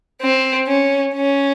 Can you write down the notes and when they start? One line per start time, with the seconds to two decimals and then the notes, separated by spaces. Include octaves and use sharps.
0.22 C4
0.68 C#4
1.14 C#4